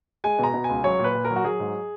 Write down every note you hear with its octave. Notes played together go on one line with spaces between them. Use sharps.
G#3 G#5
B2 A#5
B2
C#2 G#5
F#3 C#5
A#2
B4
A#2
A#4
F#3
F#4
F#3 G#4
G#2